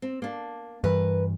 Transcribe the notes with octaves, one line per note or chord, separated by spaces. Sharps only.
C4
A#3 D4
G2 E3 A#4 B4